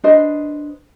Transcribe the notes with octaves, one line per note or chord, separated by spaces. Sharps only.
D4 B4 C5 D#5